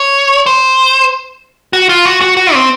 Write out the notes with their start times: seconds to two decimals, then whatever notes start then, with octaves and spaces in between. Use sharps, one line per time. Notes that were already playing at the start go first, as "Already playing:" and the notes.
Already playing: C#5
0.46 C5
1.73 F#4
1.89 F4
2.06 F#4
2.21 F#4
2.37 F#4
2.54 C4